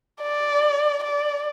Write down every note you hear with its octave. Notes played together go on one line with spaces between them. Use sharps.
D5
D5